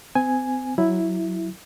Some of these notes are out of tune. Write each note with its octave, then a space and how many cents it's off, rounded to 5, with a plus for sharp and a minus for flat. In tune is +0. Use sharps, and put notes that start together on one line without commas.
C4 -35 G#5 +0
F#3 +0 E4 +0